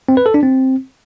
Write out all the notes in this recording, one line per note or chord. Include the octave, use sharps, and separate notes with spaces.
C4
B4
A4
D4
C4